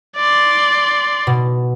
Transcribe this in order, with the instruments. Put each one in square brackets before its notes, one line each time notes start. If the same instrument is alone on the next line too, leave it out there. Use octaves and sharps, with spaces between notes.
[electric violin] D5 C6
[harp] B2